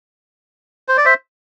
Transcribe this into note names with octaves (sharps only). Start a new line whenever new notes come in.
C5
D5
C5 E5